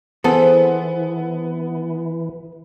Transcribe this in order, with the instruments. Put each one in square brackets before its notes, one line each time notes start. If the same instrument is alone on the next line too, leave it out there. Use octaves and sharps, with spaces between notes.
[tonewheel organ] E3 [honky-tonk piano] B3 [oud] C4 E4 C5 [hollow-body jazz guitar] G#4 A4